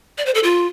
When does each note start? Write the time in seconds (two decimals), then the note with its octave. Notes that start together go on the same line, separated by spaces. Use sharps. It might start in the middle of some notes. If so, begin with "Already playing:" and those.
0.18 D5
0.26 C5
0.35 A4
0.43 F4